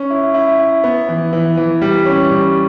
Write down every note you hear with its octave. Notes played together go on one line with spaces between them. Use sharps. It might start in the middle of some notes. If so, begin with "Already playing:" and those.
Already playing: C#4
E4
E4
E4
B3
E3
E3
E3
G3
C#4
G3